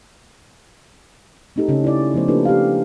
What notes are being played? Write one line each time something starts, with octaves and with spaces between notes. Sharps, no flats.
A3 C4 D#4 G4 A4
C#3 C#4
E4 D5
F3 A3 B3 C5
A#3 D4 F4 G4 A4 B4
G4 F5